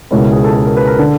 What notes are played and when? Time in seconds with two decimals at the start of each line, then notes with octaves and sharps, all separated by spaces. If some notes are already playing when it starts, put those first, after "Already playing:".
0.11 C#2 B2 G#3 C#4 E4 A#4
0.32 G#4
0.44 A4
0.55 A4
0.65 A#4
0.77 B4
0.87 A#4
0.99 D3 A4